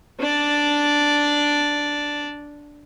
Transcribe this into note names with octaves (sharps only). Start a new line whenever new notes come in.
D4 D5